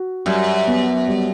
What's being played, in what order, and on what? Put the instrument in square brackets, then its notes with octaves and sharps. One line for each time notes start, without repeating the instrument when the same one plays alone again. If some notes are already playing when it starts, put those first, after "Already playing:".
Already playing: [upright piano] F#4
[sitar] F#2 [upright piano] G3
[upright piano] B3
G3